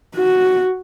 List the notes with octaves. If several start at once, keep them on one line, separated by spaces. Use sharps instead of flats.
F#4